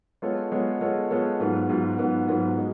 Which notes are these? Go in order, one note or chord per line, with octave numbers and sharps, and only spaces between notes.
G#3 B3 F4 A4 C#5
G#3 B3 F4 A4 C#5
G#3 B3 F4 A4 C#5
G#3 B3 F4 A4 C#5
G#2 F#3 B3 F4
G#2 F#3 B3 F4
G#2 F#3 B3 F4
G#2 F#3 B3 F4
G#3